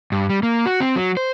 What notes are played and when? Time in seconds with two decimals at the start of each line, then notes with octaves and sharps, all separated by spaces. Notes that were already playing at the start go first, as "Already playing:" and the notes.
0.12 G2
0.29 G3
0.43 A#3
0.66 F#4
0.80 C4
0.96 F#3
1.17 C5